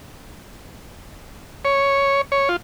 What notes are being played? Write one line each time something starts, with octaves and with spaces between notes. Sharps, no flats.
C#5
C#5
F4